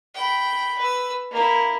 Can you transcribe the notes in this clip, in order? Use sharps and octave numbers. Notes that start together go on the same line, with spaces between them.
G5 B5
B4 E6
A#3 E4